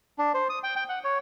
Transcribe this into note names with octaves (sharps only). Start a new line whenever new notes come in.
D4
C5
D#6
G5
G5
F#5
C#5